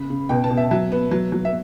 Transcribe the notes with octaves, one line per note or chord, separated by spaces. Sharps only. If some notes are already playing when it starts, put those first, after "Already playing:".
Already playing: C#3 B5
C#3
B2 G5
A5
B2
E5
F#3 E5
B3
F#3
F#3
E5